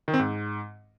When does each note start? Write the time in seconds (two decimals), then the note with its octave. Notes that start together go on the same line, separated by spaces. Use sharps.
0.08 D#3
0.14 C4
0.19 G#2